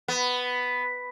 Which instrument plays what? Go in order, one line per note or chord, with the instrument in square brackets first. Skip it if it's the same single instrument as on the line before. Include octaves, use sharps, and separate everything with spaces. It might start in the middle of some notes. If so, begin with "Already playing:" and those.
[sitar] B3